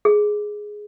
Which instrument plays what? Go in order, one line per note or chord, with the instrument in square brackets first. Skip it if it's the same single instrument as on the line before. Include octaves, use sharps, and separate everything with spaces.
[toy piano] G#4